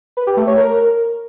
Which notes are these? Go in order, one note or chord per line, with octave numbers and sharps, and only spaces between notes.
B4
G4
A3
C#5
A#4